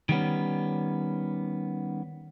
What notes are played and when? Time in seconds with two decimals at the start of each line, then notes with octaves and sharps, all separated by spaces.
0.09 D#3 G3 B3 C#4